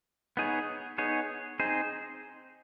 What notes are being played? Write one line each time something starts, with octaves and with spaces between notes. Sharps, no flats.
B3 D#4 G#4 C#5
B3 D#4 G#4 C#5
C4 D#4 G#4 C5